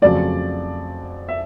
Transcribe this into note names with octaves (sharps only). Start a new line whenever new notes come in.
F2 C#3 F#3 A3 D5
E5